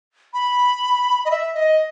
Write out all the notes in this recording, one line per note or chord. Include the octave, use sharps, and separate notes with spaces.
B5
D#5
E5
D#5